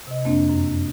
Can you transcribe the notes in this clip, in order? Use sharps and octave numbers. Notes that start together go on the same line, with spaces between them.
C3 D#5
F2 A#3 C4 D4
F#2